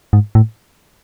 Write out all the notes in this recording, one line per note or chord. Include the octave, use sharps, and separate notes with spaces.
G#2
A2